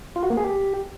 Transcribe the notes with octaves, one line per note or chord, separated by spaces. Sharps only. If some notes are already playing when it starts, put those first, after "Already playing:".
F4
F#4
A#3
G#4
G4